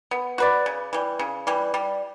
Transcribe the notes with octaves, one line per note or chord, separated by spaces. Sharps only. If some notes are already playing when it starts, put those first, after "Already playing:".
B3
F#4 B4 D5
C#3
E3 G3
C#3
E3 G3
G3